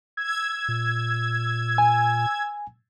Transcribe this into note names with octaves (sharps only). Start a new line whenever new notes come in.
E6 G#6
A#2
G#5